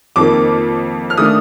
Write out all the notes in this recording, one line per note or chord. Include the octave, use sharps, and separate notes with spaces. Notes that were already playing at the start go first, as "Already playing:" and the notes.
F2 D#3 A#3 D6
F6
D#3 A3 D4 D#6